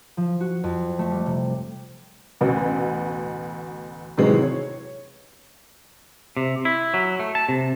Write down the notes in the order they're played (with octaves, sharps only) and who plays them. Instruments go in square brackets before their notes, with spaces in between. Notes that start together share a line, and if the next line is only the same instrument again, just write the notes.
[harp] F3
F#4
F2
A3
G3
C3
[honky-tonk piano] A1 D2 B2
A2 C3 D#3 E3 F#3 G#3
C#5
[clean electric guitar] C3
E4
F#3
A3
A5
C3